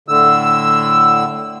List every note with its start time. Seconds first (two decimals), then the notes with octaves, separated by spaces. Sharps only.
0.08 A2 D3 E6